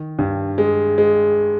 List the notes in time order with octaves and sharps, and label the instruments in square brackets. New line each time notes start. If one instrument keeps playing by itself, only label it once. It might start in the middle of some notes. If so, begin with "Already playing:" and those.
Already playing: [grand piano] D#3
G2
G#3
G#3